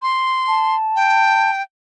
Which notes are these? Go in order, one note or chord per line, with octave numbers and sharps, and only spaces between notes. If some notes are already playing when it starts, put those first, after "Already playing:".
C6
A5
G5